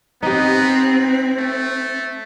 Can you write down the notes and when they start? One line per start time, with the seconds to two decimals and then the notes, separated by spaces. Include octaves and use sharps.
0.22 B3 C4 D#4 G4
1.38 A3